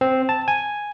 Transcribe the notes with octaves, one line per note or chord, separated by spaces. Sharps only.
C4
A5
G#5